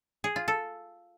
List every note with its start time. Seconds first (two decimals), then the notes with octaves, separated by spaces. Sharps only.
0.24 G#4
0.36 F4
0.48 A4